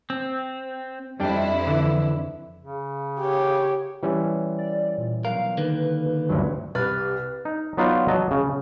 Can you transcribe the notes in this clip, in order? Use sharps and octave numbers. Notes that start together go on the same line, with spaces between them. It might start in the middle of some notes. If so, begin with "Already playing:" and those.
C4
F2 G3 D4 E4 G5
D3 E3
C#3
G4 C#5
E3 G3 C#4
D5
A#2
B1 A#4 F5
D3 D#3 A#3 B4
D2 G2 F#3
C2 G4 B4 F6 F#6 A6
D#4
F#3 B3 D#4 F4 F#4 D5
F#3 D#5 A5
C#3